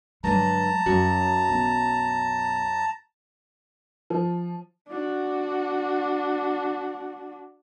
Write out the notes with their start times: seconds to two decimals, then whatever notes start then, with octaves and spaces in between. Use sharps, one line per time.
0.24 G2 D3 F#3 G#3 A5 A#5
0.86 F#2 F#3 F#4
1.49 B1
4.10 F3
4.88 D4 F#4